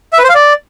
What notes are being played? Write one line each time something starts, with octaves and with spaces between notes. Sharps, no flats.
E5
B4
C5
F5
D5